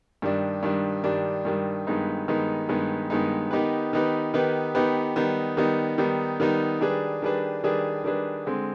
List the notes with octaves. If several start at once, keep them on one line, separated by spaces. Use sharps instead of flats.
G2 D#3 G3 D4
G2 D#3 G3 D4
G2 D#3 G3 D4
G2 D#3 G3 D4
G2 D#3 G#3 B3 D#4
G2 D#3 G#3 B3 D#4
G2 D#3 G#3 B3 D#4
G2 D#3 G#3 B3 D#4
D#3 B3 D#4 G4 B4
D#3 B3 D#4 G4 B4
D#3 B3 D#4 G4 B4
D#3 B3 D#4 G4 B4
D#3 G3 B3 D#4
D#3 G3 B3 D#4
D#3 G3 B3 D#4
D#3 G3 B3 D#4
D#3 G3 D4 G#4 B4
D#3 G3 D4 G#4 B4
D#3 G3 D4 G#4 B4
D#3 G3 D4 G#4 B4
D3 G#3 C4